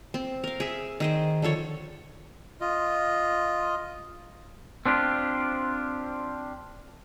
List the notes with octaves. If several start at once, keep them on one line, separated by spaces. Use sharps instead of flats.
C4
A#4 F5
G#4 E5
D#3 G#4 C5
D3 F3 A4 C#5
F4 D#5
C4 D4 F4 G4